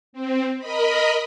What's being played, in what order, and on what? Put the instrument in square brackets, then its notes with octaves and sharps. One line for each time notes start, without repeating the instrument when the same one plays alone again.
[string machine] C4
A#4 D#5 B5